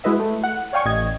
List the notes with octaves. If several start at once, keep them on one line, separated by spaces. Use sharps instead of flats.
G#3 E4 F#4 B4 D#5 E5
A3
F#5
C#5 D5 F5 G5 G#5 C#6
A1 D#5 G#6